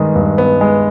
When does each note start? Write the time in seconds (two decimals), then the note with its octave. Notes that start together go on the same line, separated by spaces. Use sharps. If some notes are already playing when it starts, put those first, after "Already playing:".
Already playing: G2 D#3 G#3 B3 D#5
0.15 G2
0.38 B3
0.61 G#3